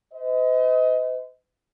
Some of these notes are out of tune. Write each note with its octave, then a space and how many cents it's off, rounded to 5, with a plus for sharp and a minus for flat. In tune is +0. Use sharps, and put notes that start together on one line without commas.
C5 -45 D#5 +25